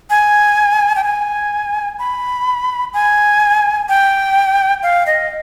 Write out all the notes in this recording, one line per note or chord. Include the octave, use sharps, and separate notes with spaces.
G#5
G5
G#5
B5
G#5
G5
F5
D#5